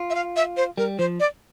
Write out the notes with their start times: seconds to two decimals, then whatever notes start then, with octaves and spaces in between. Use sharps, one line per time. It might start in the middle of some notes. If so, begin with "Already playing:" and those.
Already playing: F4
0.10 E5
0.15 F5
0.36 E5
0.57 C5
0.78 G3 A#4
0.99 F3 C5
1.20 D5